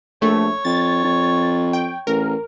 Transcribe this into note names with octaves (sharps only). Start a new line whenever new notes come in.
A#1 A3 C#5
F2 A6
F2
G5
A1 A#4